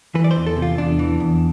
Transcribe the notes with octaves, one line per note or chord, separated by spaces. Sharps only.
E3 B4
D5
C5
E2
A4
C3
F4
E2 D4
E3
E2